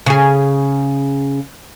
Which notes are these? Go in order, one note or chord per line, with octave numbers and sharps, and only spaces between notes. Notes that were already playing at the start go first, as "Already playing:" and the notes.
C#3 G#4